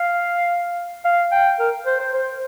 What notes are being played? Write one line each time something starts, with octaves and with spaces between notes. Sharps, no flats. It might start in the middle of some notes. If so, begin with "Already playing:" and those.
Already playing: F5
F5
G5
A#4
C5
C5
C5